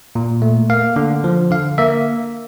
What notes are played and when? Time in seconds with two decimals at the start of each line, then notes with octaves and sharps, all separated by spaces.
0.15 A#2
0.42 A3
0.70 A#3 F5
0.96 D3
1.24 F3
1.51 D3 F5
1.78 A#3 E5